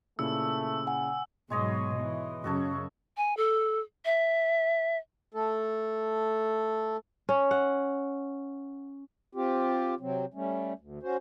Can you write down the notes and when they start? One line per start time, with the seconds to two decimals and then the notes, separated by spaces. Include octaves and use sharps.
0.19 A#2 C#3 A3 E4 E6
0.87 F#5 G#5
1.50 G#2 B2 F#3 G#3 C#5 D#5
1.97 E3
2.44 F#2 C#3 F#4 A4 C#5
3.17 G#5
3.37 A4
4.05 E5
5.34 A3 A4
7.29 C#4
7.51 F#5
9.35 C4 F4 G4
10.00 C3 F#3 C4
10.34 G3 A3 C#4
10.79 D2
11.03 C#4 F#4 C5